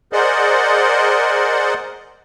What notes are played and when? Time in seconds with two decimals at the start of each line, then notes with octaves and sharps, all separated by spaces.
0.13 G#4 A#4 C5 D5 D#5 F#5